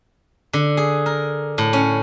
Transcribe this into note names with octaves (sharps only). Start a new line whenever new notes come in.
D3
G#4
A#4
A2
C#4